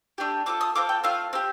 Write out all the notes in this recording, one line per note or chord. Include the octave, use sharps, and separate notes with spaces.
A3 D4 G4
C4 F4 A4 D6
D#6
C4 F4 A4 D6
G5
A3 C4 F4 F5
C4 G4